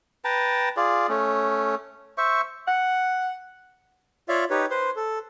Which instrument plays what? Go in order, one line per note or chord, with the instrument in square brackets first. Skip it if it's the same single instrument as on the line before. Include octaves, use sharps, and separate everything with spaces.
[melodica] B4 G5 A5 A#5
F4 G#4 D5
A3 C#4
C5 E5 C#6
[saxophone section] F#5
[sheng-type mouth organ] F4 C#5 D5 E5 F5
D#4 G4 B4 C#5
B4 C5 C6
A4